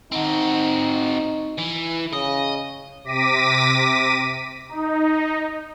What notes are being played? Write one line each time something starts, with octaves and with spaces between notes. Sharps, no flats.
C4 D#4 F#4
E3
C#3 D#5
C3 D6 A#6 B6 D#7
D#4